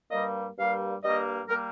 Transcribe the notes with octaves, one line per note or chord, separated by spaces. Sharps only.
G2 G3 A#3 D#5
G2 G3 A#3 F5
G2 G3 A#3 D#5
G3 A#3 A#4